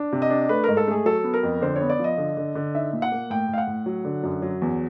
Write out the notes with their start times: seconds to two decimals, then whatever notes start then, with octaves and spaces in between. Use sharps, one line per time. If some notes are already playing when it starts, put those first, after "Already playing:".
Already playing: D4
0.12 C3
0.22 D#5
0.30 D4
0.49 A3 B4
0.64 G#2 A#4
0.77 A4
0.88 A3 G#4
1.05 F#3 A4
1.24 B3
1.34 A#4
1.43 F2
1.61 D3 C5
1.76 C#5
1.81 B3
1.90 D5
1.99 F3 D#5
2.18 D3
2.37 D3
2.55 D3
2.75 D#4 E5
2.93 A#2
3.02 F#5
3.12 A#3
3.30 A2 G5
3.49 A2 F5
3.58 F#5
3.67 A2
3.86 F#3
4.05 D3
4.23 F#2
4.42 F#3
4.62 E2